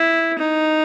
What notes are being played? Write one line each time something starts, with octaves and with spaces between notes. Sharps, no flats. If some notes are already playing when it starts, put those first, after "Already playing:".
Already playing: E4
D#4